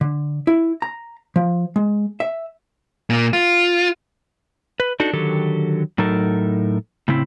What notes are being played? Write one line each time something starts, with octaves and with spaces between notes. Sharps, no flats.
D3
E4
A#5
F3
G#3
E5
A#2 A#3
F4
B4
D4 D#4 F#4 A4
D3 D#3 F#3 G4 A4
A2 F#3 D#4 A4 A#4
A2 C#3 C4 E4